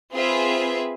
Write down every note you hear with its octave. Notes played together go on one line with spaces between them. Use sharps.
C4 F4 G#4 B4 E5